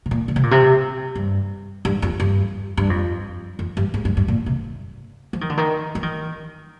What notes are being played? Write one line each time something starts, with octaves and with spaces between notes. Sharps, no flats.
C3
A#2
D3
C3
A#2
C3
G2
G2
F2
G2
G2
F2
F2
G2
G#2
G2
G2
A#2
C3
F3
D#3
D3
D#3
F3
D#3